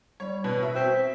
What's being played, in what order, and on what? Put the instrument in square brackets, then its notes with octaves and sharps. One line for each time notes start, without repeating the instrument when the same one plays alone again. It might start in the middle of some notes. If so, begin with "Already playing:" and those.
[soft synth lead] G3 [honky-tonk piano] C#5
[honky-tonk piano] B2 [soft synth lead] B4
[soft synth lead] F#4 [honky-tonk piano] E5
[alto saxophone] C4 [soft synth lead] B6